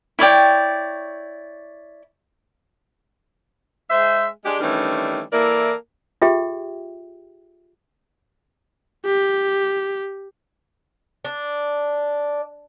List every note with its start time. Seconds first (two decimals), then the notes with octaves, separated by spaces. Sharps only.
0.19 E4 C#5 D5 G5
3.91 G#3 C5 E5
4.45 G#3 D4 G4
4.61 D#3 E3 G3 A3 C#4 D4
5.32 E3 A#3 E4 A4 A#4 D5
6.22 F4 G4 G#4 E5 G5
9.06 G4
11.25 D4